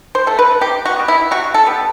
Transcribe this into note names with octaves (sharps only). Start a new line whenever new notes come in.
C5
A3 A4
B4
C3 G4
F#4
G3 B3
E4
C3 F#4
A4
G3 B3